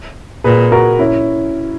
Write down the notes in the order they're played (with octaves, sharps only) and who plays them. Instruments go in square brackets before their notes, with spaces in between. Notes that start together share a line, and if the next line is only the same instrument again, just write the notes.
[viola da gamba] A#2 [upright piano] G#4 B4
[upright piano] F#4 A#4
C#4 E4